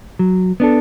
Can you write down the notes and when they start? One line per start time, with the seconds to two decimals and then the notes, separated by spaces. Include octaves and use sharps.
0.19 F#3
0.60 B3 D4 A4